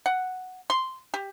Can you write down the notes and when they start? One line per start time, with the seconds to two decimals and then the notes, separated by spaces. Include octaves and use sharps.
0.06 F#5
0.70 C6
1.14 G4